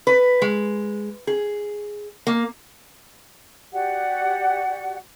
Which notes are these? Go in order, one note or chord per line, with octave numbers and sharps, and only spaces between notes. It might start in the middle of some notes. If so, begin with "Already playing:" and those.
B4
G#3
G#4
A#3
F#4 G4 D5 F#5